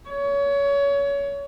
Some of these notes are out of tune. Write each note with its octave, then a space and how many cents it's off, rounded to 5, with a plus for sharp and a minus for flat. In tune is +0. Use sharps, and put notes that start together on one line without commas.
C#5 +25